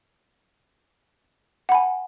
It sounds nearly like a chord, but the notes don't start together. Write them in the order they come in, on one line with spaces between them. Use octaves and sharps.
F#5 B5 G#5